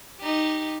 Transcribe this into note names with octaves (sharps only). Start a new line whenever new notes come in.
D#4 G4